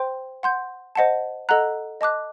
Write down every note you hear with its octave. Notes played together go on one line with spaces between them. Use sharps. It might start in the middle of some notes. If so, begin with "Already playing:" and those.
Already playing: C5 G5 C6
F#5 C6 G6
C5 D#5 F#5 A5
A4 D#5 F#5 A#5 F#6
D#5 A5 D6 F#6